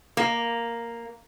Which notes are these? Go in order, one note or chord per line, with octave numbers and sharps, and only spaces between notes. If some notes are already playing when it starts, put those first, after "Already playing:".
A#3